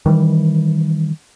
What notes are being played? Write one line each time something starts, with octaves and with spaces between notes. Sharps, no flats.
D#3 E3 G3